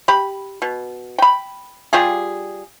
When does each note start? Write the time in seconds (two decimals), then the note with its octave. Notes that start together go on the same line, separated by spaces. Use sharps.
0.08 G4 B5
0.62 B2
1.18 G5 B5
1.93 G3 F4 G4 G#4